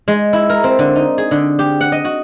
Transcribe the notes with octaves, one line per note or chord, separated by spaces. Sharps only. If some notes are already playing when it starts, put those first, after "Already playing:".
G#3
E4
A#4
C4
D3
D#4
G#4
D3
G4
F#5
D#5
F#4